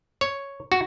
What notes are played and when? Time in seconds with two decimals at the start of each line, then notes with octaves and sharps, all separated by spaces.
0.21 C#5
0.72 F#4